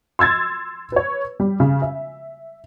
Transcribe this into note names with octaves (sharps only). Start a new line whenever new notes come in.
C6 E6 G#6 A6
B4 C#5
G3
C#3
E5